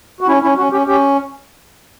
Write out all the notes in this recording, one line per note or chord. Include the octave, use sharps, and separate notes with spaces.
F#4
C#4 E4
C#4 E4
C#4 F#4
C#4 G4
C#4 G4